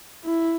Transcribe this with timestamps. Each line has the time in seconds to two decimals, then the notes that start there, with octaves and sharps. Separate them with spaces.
0.24 E4